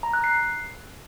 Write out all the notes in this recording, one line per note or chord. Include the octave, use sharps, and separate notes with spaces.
A#5
F#6
C7